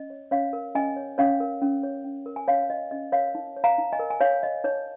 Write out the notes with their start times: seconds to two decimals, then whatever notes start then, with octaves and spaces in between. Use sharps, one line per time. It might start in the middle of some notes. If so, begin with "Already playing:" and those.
Already playing: C#4 D#5
0.10 C#5
0.31 C#4 C#5 F5
0.53 A#4
0.75 C#4 D#5 G#5
0.96 C#5
1.18 C#4 C#5 F5
1.40 A#4
1.62 C#4
1.83 C#5
2.04 C#4
2.26 A#4
2.36 G#5
2.48 C#4 C#5 F5
2.70 C#5 D#5
2.91 C#4 D#5
3.12 A#4 C#5 F5
3.35 D#4
3.57 C#5
3.64 F5 A#5
3.78 D#4
3.93 D#5 G#5
3.99 A#4
4.10 G#5
4.20 D#4 C#5 F5
4.42 C#5 D#5
4.64 D#4 C#5